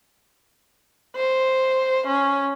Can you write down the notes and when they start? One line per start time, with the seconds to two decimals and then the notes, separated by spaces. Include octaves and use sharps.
1.16 C5
2.07 C#4